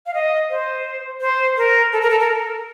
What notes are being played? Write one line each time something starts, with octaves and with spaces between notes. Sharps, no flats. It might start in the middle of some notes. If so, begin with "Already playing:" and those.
F5
D#5
C5
C5
A#4
A4
A#4
A4
A#4